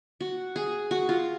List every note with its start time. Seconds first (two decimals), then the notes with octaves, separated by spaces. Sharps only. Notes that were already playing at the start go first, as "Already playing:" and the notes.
0.21 F#4
0.56 G#4
0.91 F#4
1.09 F4